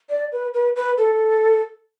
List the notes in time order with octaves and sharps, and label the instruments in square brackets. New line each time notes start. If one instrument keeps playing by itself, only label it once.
[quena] D5
B4
B4
B4
A4